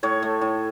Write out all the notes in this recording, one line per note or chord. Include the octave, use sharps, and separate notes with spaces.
A2 C#5
A3
A2